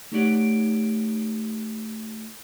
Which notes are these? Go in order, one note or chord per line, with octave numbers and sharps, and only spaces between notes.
A3 D#4 G4 C#5 D5 F#5